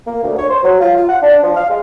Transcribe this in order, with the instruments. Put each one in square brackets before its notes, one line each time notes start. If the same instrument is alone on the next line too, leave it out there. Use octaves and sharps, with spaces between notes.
[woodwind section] A#3
D2
C#5
C5
F#3
F4
F4
F#5
D4
F3
F5
G#3